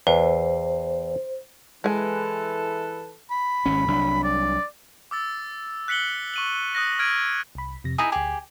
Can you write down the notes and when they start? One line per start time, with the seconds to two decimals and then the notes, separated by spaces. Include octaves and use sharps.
0.07 E2 B4 C5
1.84 E3 G#3 A4 B4 G#5
3.31 B5
3.66 G#1 G#2 C#4
3.88 C2 F#3 D4
4.24 D5
5.11 D6 E6 A6
5.88 F#6 B6 C#7 F#7 G7
6.34 C#6 D#7 F#7
6.75 D#6 F#6 A#6
6.99 F6 G#6 D7 D#7
7.55 C2 B5
7.84 F2 C3 A#6
7.98 D#4 E4 G#4 D#6 A#6
8.12 D2 G4 G#4 D6